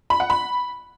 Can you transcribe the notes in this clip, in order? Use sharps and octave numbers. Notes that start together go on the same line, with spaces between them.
B5
F#5
B5